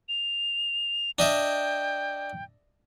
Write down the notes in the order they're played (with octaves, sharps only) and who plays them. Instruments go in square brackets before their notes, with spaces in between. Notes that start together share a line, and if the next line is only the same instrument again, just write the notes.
[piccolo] F7
[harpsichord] D4 D#5 E5 [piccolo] G5